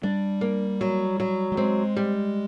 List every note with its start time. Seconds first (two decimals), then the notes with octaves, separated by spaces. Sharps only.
0.03 G3 D4
0.41 A#3
0.81 F#3
1.20 F#3
1.52 G3
1.57 G#3 C4
1.97 G3